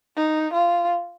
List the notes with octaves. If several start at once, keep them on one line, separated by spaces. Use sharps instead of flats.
D#4
F4